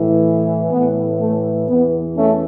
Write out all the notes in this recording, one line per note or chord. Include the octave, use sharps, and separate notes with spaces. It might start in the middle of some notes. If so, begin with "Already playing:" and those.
Already playing: A2 E3
A2 E3 B3
A3
E2 E3 B3
A3 C#4